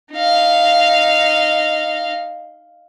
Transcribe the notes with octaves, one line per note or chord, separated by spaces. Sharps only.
D#4 F5